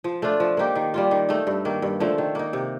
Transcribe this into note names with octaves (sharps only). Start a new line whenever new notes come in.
F3
A3 D4 F4
F3
A#3 D#4 G4
D#3
G3 A#3 F4
D#3
A3 D#4
G2
D#3 A#3
G2
D3 F3 A3
D#3
A#3 D#4
C3